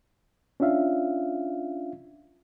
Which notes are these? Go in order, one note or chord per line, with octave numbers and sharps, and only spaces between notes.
C#4 D4 F4 E5 F5